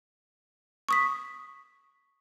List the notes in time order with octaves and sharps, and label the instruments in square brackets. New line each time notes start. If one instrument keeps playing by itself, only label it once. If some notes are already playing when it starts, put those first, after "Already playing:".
[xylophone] C#6 D#6 B6